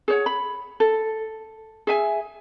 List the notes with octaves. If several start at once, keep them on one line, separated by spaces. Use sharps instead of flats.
G#4 C#5 F#5
B5
A4
G#4 E5 G#5